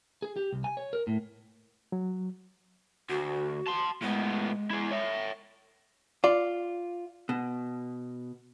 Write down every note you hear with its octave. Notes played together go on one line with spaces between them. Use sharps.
G#4
G4
C2
G#5
C#5
A#4
A2
F#3
D2 F#4
A5 C6
A2 G#3 B3
E4 G#4
C#5 E5
F4 D5
B2